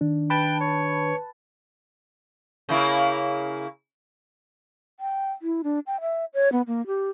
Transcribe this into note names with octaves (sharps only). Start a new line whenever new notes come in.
D#3 D4
B4 G5 A5
C#5
C#3 A#3 E4
G5
E4
D4
G5
E5
C#5
B3
A#3
G4